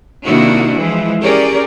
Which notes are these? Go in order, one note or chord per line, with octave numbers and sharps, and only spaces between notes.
C3 D#3 A#3 D4 E4 F#4
E3 F3 G#3
C#4 G4 G#4 A#4 D5